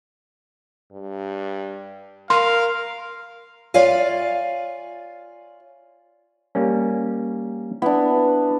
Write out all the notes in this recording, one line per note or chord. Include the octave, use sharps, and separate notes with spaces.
G2
A#4 F5 C6
F4 C#5 D5 E5 F5 G#5
G3 A#3 C#4
B3 D4 E4